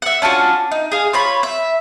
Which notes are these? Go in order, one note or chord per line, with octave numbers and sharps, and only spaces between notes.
E5 F#5
C#4 D4 F4 F#4
D#4
G#4 F5
F4 C#5 B5
E5